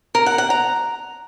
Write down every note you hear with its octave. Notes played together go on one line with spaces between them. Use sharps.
A#4
F#5
F#5
A#5